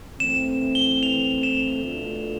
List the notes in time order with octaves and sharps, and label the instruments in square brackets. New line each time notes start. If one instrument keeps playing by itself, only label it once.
[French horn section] E3 A3 C4 [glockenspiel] E7
[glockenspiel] G7
F7
E7
[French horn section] B2 A3 D4 F4